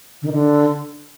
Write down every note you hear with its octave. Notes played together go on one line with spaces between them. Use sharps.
D3
D#3
D3